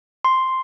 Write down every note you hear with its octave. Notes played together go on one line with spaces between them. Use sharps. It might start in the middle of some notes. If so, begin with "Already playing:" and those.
C6